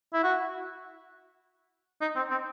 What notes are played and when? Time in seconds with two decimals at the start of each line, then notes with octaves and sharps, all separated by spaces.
0.14 E4
0.23 F#4
2.01 D#4
2.16 C4
2.31 C4